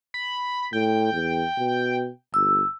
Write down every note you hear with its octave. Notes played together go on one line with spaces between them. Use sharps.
B5
A2 G5
E2
B2
G1 E6